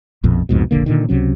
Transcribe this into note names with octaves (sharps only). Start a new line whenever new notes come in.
A#1 F2 B2
C2 F2 G#2 B2
F1 A#1 D3 A#3
A#2 D3 D#3
C#2 C3 F#3 C#4